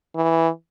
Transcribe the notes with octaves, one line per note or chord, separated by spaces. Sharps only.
E3